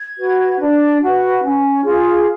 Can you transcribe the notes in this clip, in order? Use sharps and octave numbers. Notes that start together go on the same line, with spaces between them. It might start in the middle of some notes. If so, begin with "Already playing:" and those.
Already playing: G#6
F#4 B4
D4
F#4 B4
C#4
F4 G#4